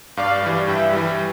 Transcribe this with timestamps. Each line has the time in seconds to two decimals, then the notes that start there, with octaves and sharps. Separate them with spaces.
0.17 G2 D5 F5
0.43 E3 G3
0.68 G2 E5 G5
0.93 E3 G3